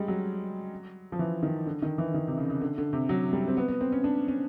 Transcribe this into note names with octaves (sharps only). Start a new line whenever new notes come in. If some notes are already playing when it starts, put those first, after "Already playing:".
Already playing: G3 G#3
F#3
F3
E3
D#3
D3
D#3
E3
D#3
C3
C#3
C#3
D3
D3
C3
F#3
G3
C4
B3
B3
C4
C#4
D4
C#4